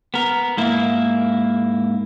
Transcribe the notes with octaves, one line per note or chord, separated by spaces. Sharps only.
B3 A#4
G#2 A#3 E4